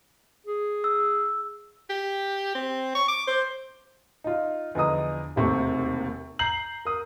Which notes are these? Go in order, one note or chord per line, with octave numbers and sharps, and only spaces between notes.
G#4
E6
G4
C4
C#6
D6
C5
D#4 F4
E2 D3 F3 D#5 A#5 D#6
E1 D#2 C3 A3 C4 C#6
A#5 G6 C7 F#7
A#4 D#6